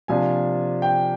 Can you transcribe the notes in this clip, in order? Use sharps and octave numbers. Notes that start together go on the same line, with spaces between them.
C3 F3 A#3 D4 G#5
G5